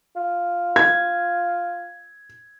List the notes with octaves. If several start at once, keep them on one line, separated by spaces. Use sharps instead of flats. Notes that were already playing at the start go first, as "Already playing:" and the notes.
F4
G#6